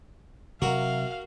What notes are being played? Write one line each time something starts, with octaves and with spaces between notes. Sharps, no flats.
C3 F#3 F#4 A#4 F5